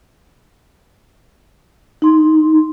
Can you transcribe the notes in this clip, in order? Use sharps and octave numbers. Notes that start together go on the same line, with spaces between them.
D#4 C6